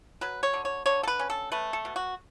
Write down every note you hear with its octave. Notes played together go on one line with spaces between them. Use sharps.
F#3 B4
C#5
D3
C#5
D3 C#5
A4
B4
C#4
A4
A3 B4
A4
B2
F#4